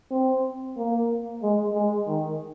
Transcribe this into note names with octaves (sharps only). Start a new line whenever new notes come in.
C4
A#3
G#3
G#3
D#3